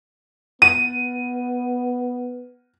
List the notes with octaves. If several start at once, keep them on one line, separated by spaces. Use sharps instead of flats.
B3 D#7